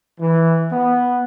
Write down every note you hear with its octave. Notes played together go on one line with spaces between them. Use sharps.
E3
B3